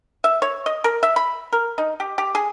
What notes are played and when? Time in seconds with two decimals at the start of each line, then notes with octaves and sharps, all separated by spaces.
0.24 E5
0.42 C#5
0.66 D#5
0.84 A#4
1.03 E5
1.16 B5
1.53 A#4
1.78 D#4
2.00 G4
2.18 G4
2.35 G#4